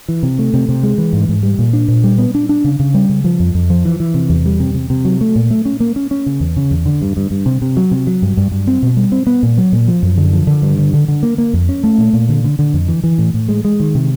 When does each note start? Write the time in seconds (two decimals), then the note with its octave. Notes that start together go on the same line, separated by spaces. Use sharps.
0.08 E3
0.23 C3
0.39 A3
0.54 C3
0.69 C3
0.83 G#3
0.98 E3
1.13 G#2
1.29 G#2
1.43 G3
1.59 A#2
1.73 D4
1.88 A#2
2.04 G3
2.18 B3
2.35 D4
2.49 D4
2.64 C#3
2.80 C#3
2.94 G3
3.09 C#3
3.24 F3
3.40 F2
3.55 F2
3.70 F3
3.85 E3
4.00 E3
4.14 C3
4.30 E2
4.45 G3
4.60 C3
4.74 C3
4.90 C3
5.05 F#3
5.21 A3
5.36 A#2
5.51 A3
5.65 C#4
5.80 A#3
5.96 C#4
6.11 C#4
6.26 C#3
6.40 E2
6.57 C#3
6.71 E2
6.86 D3
7.02 G2
7.17 G2
7.31 G2
7.46 C3
7.62 C3
7.77 F#3
7.91 C3
8.07 F#3
8.22 G2
8.37 G2
8.52 G2
8.67 C4
8.83 B2
8.97 G3
9.12 C4
9.27 B3
9.43 A#2
9.58 F#3
9.72 A#2
9.88 F3
10.02 F#2
10.18 D3
10.33 F3
10.47 D3
10.62 G2
10.78 D3
10.94 D3
11.08 D3
11.23 A#3
11.38 A#3
11.53 F2
11.69 C#4
11.84 A3
11.98 A#2
12.13 A#2
12.29 D3
12.44 D3
12.59 D3
12.74 F2
12.88 E3
13.04 E3
13.18 A2
13.34 A2
13.48 G#3
13.65 G#3
13.80 D#3
13.95 C3